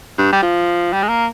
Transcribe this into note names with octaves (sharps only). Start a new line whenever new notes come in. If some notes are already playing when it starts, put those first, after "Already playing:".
G2
G3
F3
G3
G#3
A#3